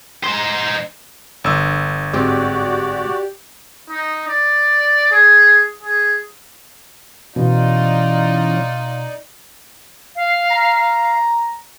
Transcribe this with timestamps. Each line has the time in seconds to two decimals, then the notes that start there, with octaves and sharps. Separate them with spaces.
0.23 D#4 C5
1.44 G1 E6
2.14 G#2 C4 F#4 G4 D5 G5
3.90 D#4
4.28 D5
5.12 G#4
5.83 G#4
7.36 B2 E3 C#4 D#4 F4 D5
10.16 F5
10.51 A#5